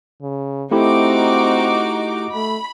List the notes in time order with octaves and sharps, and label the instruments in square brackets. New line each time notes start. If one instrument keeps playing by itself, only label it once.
[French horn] C#3
[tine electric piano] A3 E4 G4 [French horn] C4 [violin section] D#4 F#4 D6
[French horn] A3 [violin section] B5